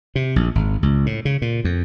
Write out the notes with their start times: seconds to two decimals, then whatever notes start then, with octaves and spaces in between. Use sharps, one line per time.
0.15 C3
0.36 A#1
0.55 G#1
0.83 C#2
1.06 A2
1.25 C#3
1.42 A#2
1.65 F2